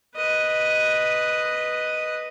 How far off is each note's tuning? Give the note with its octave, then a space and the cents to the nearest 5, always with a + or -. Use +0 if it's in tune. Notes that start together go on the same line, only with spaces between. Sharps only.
B4 +0 D#5 +0